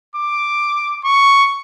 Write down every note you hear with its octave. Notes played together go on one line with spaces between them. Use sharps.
D6
C#6